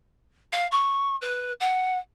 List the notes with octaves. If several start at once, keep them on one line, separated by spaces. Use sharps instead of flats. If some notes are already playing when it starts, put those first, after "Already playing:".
F5
C#6
B4
F#5